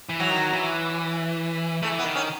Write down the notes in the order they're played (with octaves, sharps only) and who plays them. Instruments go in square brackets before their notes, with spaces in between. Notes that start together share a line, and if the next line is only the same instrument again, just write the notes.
[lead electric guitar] E3
[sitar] F#3
[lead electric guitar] D#3
E3
[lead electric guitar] E3 [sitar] A3
[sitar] B3
[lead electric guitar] D#3
[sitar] C#4